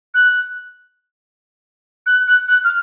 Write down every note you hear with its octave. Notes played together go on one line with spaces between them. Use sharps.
F#6
F#6
F#6
F#6
F6